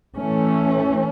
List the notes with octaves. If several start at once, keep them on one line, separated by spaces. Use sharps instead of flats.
E3 A3 C#4